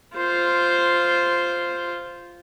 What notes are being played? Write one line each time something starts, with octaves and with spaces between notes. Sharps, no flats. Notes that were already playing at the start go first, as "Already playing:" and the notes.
F4 C5